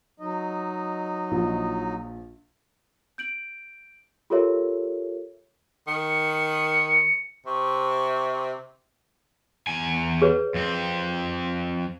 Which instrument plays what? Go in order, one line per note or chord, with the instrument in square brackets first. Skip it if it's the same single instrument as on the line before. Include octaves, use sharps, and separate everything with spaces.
[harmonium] F#3 D#4 D#5
[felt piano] A#1 F3
[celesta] G6 D7 F#7
F4 G4 A4 A#4 C#5 E5
[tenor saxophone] D#3 [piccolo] C#7
[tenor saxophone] C3 [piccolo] C#6
[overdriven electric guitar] E2 G#5
[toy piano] G#4 B4 C#5
[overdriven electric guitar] F2 C4